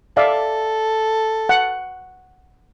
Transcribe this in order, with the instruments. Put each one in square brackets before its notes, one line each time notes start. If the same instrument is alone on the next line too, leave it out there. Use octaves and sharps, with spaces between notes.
[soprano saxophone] A4 [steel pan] D5 E5 F5
[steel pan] F#5